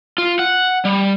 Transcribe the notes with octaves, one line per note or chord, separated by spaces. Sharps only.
F4
F#5
G3